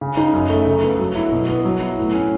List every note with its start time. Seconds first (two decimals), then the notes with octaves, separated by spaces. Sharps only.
0.01 C#3
0.17 D#4
0.33 F#2
0.50 A3
0.66 C#3
0.83 B3
0.99 F#3
1.15 E4
1.32 B2
1.48 B3
1.65 F#3
1.82 E4
1.98 A2
2.14 C#4